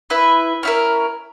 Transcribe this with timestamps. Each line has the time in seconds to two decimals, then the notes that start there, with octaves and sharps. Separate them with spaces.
0.10 E4 B4 E5
0.63 C#4 E4 A#4